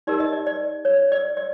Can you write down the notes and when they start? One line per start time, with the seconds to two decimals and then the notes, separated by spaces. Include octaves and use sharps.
0.07 D#4 G4 A#4 D5
0.20 D#5
0.33 D5
0.47 D5
0.85 C#5
1.12 D5
1.37 D5